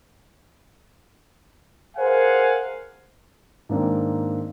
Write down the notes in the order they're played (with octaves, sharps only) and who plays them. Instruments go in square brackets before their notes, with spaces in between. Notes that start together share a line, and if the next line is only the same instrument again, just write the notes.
[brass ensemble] G#4 A#4 C5 F5 F#5 G#5
[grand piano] G#2 D#3 A#3 C4 D4